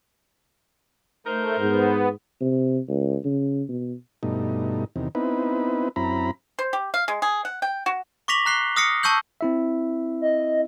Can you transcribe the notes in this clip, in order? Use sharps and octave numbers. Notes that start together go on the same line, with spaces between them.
A3 D#4 A#4 C5
G#2 B3
C3
C#2
C#3
B2
G2 B2 A3 D#4
E2 C3 D#3
B3 C4 D#4 E4 B4
F#2 C4 E4 A#5 B5
C5
G4
F5
G#3
G#4
F#5
G5
F#4
C#6 D6 A#6 B6 F7 F#7
A#5 F#6 C7 G7
D#6 F6 A#6 C7 C#7
A5 C#6 E6 G6 F#7
C4 E4 E5
D#5